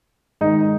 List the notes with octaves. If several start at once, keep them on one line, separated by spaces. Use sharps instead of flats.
G#2 D#3 D#4